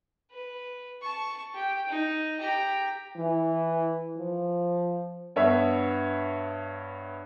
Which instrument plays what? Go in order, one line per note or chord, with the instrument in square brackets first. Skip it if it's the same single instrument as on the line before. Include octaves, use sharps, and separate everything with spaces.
[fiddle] B4
A5 C#6
G4 G5
D#4
G4 A#5
[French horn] E3
F3
[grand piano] G2 B3 C#5 E5